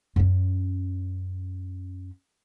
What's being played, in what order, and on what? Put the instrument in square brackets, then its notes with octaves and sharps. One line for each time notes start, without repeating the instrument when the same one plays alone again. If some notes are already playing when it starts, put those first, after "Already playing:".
[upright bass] F#2 C#4